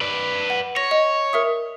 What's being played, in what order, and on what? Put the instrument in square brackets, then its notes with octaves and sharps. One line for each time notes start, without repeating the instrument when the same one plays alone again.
[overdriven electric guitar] B4 D5
[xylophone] F#5
[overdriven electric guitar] C#5 [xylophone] A#6
[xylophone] D#5
A#4 E5 D#6